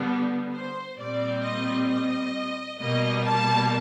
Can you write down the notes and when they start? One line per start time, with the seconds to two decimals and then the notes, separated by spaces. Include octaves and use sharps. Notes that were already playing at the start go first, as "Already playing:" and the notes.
Already playing: D3 G3 B3
0.53 C5
0.98 A#2 G3 C4 D5
1.44 D#5
1.89 D#5
2.80 B2 G3 A#3 D#5
3.25 A5